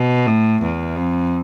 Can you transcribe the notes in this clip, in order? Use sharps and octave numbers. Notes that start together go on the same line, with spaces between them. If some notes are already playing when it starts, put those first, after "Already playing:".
Already playing: B2
A2
E2
F2